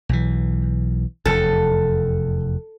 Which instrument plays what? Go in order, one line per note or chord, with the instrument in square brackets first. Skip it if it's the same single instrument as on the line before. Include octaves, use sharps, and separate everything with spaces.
[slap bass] B1 E3
[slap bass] F1 E2 [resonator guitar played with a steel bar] A4